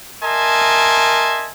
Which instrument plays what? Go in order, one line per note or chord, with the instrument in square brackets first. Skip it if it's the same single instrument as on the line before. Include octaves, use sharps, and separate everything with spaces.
[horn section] A#4 D#5 E5 G#5 A5 C6